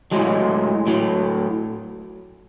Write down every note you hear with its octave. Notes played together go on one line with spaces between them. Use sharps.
A2 F#3 G#3
A2 F#3